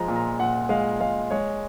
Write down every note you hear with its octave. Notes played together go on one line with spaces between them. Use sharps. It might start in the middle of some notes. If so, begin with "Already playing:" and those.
Already playing: F3 G#3 A#5
A#2
A#5
A#2 F#5
G#3 F5
G#3 F5
G#3 C#5